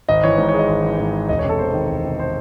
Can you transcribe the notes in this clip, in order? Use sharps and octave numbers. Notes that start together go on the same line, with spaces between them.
G#1 D#5
E3 C#5
G#2
C#5
G#3 D#5
G#1
E3
G#2
G#3
E1 D#5
C#5
C3 A4
E2 C5
D#3
E1
C3
C5